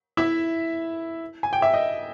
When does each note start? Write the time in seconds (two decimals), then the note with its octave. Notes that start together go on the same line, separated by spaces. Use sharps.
0.17 E4 E5
1.43 G#5
1.53 G5
1.62 E5
1.74 D#5